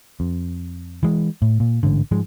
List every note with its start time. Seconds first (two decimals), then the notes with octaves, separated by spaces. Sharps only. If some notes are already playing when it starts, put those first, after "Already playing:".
0.20 F2
1.03 E3 G#3
1.42 A2
1.60 A#2
1.83 A1 G#2 D3
2.11 G#2 F3 G#3